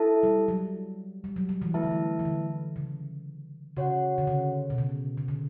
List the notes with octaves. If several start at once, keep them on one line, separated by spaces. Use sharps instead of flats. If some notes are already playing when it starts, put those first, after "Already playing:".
Already playing: E4 A4 E5 A5
G3
F#3
G3
F#3
F#3
E3
E3 A3 E4 B4 E5 A5
D3
E3
E3
D3
C#3
C#3 F#4 C#5 F#5
D3
C#3
B2
C#3
C#3
D3